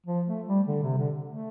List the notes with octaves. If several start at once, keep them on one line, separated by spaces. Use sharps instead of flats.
F3
A3
G3
D3
C3
D3
A3